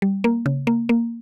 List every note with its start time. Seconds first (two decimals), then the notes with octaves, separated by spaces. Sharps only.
0.02 G3
0.24 A#3
0.46 C#3
0.67 A#3
0.89 A#3